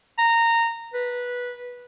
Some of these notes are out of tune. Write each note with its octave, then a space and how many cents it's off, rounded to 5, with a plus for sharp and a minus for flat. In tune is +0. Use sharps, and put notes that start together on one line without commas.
A#5 -15
B4 -10